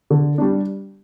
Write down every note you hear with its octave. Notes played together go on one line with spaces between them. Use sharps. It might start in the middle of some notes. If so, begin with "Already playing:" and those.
D3
G3 D4